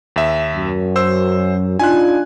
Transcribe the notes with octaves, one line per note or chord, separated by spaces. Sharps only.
D#2 E5
F#2
C5 E6
D4 D#4 F4 G#5 F#6